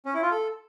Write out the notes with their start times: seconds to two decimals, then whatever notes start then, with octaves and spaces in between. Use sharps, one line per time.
0.06 C#4
0.14 E4
0.22 F4
0.31 A4